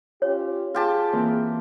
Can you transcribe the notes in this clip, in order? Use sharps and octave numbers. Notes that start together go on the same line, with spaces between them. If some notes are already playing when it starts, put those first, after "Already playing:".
C#4 F4 G4 C#5
F4 G4 G#4 A5
E3 A#3 C4